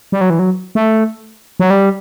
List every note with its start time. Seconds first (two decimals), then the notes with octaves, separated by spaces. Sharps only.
0.12 G3
0.21 F#3
0.30 E3
0.39 F#3
0.75 A3
1.60 F#3
1.70 G3